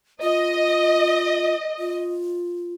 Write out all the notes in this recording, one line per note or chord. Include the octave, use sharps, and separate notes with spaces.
F4 D#5
F4